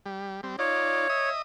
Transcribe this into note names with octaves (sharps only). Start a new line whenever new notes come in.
G3
G3 C4
D#4 F4 C#5 D5
D#5 E5 D#6